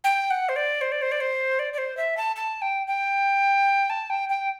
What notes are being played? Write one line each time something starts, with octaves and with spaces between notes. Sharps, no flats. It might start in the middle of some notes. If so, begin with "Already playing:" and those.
G5
F#5
C5
D5
C5
D5
C5
D5
C5
D5
D5
C5
E5
A5
A5
G5
G5
A5
G5
G5